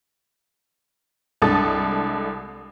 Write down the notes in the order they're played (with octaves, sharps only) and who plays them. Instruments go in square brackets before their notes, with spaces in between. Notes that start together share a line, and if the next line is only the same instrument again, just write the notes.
[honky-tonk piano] C2 G#3 D4 A4 D#6 A6